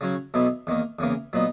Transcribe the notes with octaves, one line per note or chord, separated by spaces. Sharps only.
C#3 F#3 C#4 F#4
B1 B2 F#3 B3 E4
E2 D#3 A#3
E2 C#3 E3 A#3
A#2 F#3 B3 D#4